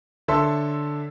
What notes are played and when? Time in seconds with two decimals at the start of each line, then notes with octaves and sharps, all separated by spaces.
0.28 D3 A4 C#5 E5 A5 C6